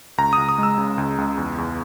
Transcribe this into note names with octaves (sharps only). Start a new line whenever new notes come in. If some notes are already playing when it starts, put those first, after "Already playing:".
C#2 A#5
C#2 D#6
D#6
G#3 E6
C#3
C#2
C#2
E2
E2